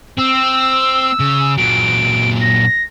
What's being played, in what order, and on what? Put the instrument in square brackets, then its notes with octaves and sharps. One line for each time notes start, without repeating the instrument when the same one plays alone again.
[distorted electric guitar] C4 [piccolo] E6
[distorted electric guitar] C#3
[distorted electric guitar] A#2 F#3 [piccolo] D7
[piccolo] A#6